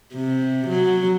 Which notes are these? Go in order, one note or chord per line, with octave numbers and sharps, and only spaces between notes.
C3
F#3